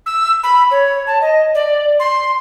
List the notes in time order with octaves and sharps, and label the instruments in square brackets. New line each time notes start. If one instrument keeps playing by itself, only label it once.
[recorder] E6
B5
C#5
A5
D#5
D5
C6